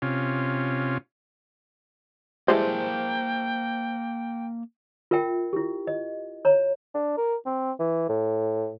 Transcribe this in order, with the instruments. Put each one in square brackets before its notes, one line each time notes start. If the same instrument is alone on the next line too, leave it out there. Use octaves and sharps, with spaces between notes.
[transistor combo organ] C3 C#4 F4
[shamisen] E3 G3 G#3 [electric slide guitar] A#3 A#4 A5 [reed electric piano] C5 [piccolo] G5
[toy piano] F4 A#4 E5 G5
E4 G4
D#5
C#5 A#5
[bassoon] D4
A#4
C4
E3
A2